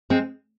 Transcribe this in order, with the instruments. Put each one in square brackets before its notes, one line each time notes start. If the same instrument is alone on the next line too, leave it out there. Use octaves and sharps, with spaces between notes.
[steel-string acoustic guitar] G#3 C4